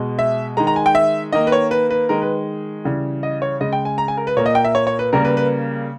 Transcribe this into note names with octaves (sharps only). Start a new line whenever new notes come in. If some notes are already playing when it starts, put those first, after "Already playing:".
Already playing: B2 G#3
E5
D#3 G#3 A#5
A#5
G#5
G5
E5
D#3 A#3 D#5
B4
C#5
B4
B4
D#3 G#3 A#4
B4
C#3 E3 G3
D#5
C#5
C#3 G#3 D#5
G5
G#5
A#5
G#5
A#4
B4
A#2 A#3 C#5
D#5
G5
E5
C#5
C#5
B4
C#3 G3 A#3 A#4
B4
B4